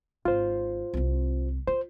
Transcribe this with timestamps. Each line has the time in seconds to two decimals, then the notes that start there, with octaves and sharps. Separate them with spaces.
0.25 G#1 F4 C5
0.94 C2 C4
1.67 F4 C5